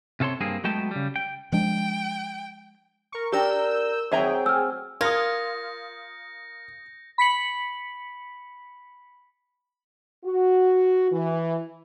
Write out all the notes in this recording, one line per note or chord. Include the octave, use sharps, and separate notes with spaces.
C3 F4 A4 C#5 C6
G2 A#3 C4 G#4
F#3 G#3 A3 B3 G5 A5
C#3 G3
G5
F3 G#3 D4 G5
A#4 C#6
D4 G4 A#4 E6 G6
D#3 F#3 C4 G#4 E5 G5 A#5
A3 G#5 E6 F6
F4 A#4 D#6 G6 G#6 A#6 C#7
B5 B6 C#7 F#7
F#4
E3